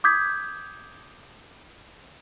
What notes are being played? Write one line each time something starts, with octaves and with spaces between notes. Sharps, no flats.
D6 D#6 G6 G#6 B6